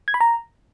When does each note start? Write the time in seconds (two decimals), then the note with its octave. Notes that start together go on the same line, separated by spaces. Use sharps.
0.08 G#6
0.14 B5
0.21 A#5